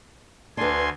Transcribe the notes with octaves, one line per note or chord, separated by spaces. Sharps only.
D2 D4 B4 G#5 C6